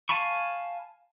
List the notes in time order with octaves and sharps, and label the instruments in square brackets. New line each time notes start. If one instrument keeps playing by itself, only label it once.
[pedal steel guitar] F5 G#5 A5 B5 C#6